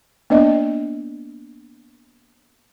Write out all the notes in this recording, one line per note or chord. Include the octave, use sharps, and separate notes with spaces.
A#3 B3 D4 D5 D#5